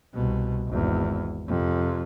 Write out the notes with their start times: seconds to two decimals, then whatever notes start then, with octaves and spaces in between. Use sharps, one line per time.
0.14 C2 B2
0.68 G#1 E2
1.48 F2 C3